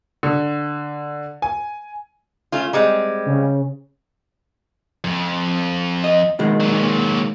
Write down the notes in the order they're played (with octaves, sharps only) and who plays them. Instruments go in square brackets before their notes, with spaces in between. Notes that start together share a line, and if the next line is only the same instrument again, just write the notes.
[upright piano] D3
G#5
[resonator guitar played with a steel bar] A3 C#4 F4
G3 G#3 C4
[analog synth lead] C#3
[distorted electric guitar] F2
[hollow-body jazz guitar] D#5
B2 D#3 G#3
[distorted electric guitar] A#2 F#3